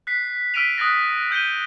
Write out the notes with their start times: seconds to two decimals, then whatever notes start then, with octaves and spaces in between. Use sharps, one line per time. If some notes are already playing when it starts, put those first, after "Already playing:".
0.07 F#6 B6 C7
0.54 E6 F6 B6 D7 D#7 F7
0.78 D#6 F#6 A6 A#6
1.31 E6 G6 C#7 D#7 G7